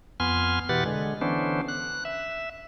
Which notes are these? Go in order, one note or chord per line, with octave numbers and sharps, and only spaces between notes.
F2 B3 G#5 C6 F6
B2 E3 G4 B4 F#5 A6
D3 G#3
D3 E3 B3 C#4 D4 C5
F#6
E5